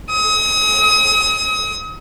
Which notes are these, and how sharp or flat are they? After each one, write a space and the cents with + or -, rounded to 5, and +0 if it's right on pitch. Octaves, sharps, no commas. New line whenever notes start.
D#6 +35